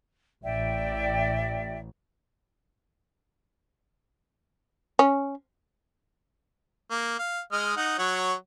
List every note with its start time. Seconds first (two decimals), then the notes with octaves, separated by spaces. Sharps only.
0.43 A1 D5 E5 G5
4.99 C#4
6.91 A#3
7.19 F5
7.52 G#3 D#5 F6
7.77 D#4 F#5
7.99 F#3 C#5 F#5